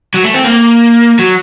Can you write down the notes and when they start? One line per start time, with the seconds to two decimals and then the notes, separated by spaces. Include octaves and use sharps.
0.14 F#3
0.23 A3
0.34 C4
0.44 A#3
1.19 F#3